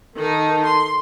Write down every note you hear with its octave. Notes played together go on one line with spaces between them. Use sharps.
D#3 D#4 A4
C6